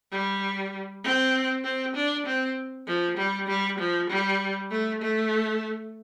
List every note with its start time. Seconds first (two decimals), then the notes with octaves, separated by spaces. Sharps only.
0.11 G3
1.04 C4
1.64 C4
1.95 D4
2.26 C4
2.87 F3
3.17 G3
3.48 G3
3.79 F3
4.09 G3
4.71 A3
5.01 A3